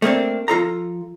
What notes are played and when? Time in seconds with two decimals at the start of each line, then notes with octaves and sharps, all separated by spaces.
0.02 A3 A#3 C4 D4
0.48 F3 F4 A4 A#5